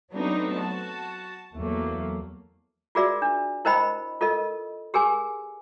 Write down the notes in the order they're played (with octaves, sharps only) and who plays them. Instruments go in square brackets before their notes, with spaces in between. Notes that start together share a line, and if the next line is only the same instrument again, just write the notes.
[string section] F#3 A3 B3 C4 D4 D#4
F#4 A5
E2 F#3 A3 A#3
[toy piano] F4 F#4 G#4 A#4 D5 E5
D4
E4 A#4 C5 D#5 G5 B5
F4 A4 A#4 D#5
G4 G#4 A#4 G#5